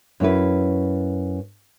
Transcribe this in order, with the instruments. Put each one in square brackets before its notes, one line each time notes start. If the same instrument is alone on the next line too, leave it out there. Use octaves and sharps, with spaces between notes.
[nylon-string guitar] F#2 C#4 E4 B4